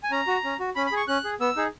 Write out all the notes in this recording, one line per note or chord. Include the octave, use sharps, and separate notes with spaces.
G#5
C#4 A#5
F#4
C#4
F#4
C#4 B5
B5
G#4
C#6
C#4 F#6
G#4
B3 E6
D#4 G#4